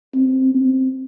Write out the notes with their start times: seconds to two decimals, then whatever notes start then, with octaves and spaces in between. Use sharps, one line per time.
0.15 C4
0.54 C4